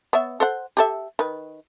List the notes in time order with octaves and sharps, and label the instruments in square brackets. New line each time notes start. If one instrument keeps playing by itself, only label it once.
[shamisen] B3 C#5 E5
A4 C5 F#5
G4 A4 E5
D#3 B4